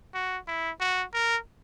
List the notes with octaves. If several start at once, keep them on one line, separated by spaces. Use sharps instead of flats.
F#4
E4
F#4
A#4